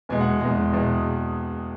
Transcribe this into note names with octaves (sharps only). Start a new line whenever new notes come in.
E2 B2 G#3 G#5
F#5
E2 B2 G#3
E2 B2 G#3